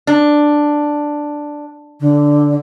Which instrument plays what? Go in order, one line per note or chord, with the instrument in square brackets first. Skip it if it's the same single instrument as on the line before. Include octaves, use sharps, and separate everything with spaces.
[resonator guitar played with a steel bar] D4
[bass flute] D3